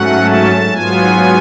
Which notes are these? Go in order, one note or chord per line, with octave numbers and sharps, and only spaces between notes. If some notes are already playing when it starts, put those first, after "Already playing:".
Already playing: G#2 F#3 A3 C#4 F#5
A5
G#2 F#3 B3 F4 G#5